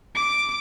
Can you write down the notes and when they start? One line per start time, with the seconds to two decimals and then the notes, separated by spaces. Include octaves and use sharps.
0.15 D6